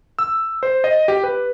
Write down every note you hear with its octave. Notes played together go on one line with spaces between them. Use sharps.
E6
C5
D#5
G4
B4